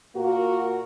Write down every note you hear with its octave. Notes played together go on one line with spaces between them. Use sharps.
A#2 A#3 F#4 A#4